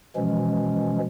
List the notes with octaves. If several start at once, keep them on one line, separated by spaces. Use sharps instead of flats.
B2 E3 F3 G#3 C#4